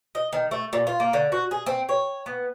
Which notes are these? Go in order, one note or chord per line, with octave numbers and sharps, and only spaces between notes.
D#5
D#3
A3
A#2
F4
A#3
D3
F#4
G#4
C4
C#5
B3